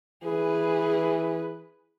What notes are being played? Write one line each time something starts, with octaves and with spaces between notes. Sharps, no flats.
E3 G#4 B4